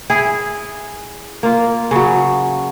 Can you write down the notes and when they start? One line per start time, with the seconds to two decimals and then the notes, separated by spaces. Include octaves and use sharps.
0.10 E4 G#4
1.43 A#3 F4
1.91 C#3 F#3